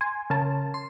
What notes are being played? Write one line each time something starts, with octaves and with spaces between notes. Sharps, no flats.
G#5 C6
C#3 A#4 A5
C6